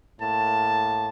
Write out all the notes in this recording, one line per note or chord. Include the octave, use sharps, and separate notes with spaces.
A2 A#3 A5